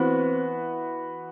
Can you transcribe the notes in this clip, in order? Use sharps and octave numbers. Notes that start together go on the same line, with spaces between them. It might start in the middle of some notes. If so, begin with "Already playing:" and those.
Already playing: E3 B3 C4 F#4 B4 C5